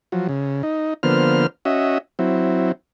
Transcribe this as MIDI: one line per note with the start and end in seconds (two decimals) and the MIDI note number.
0.12 0.27 53
0.12 0.27 54
0.29 0.62 49
0.63 0.94 63
1.03 1.47 50
1.03 1.47 53
1.03 1.47 58
1.03 1.47 59
1.03 1.47 72
1.03 1.47 89
1.65 1.98 61
1.65 1.98 66
1.65 1.98 75
1.65 1.98 76
2.19 2.72 54
2.19 2.72 60
2.19 2.72 64